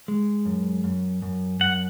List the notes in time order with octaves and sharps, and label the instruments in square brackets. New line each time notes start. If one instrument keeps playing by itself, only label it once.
[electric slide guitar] G#3
F#2
F#2
F#2
[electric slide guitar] F#2 [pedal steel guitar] F#5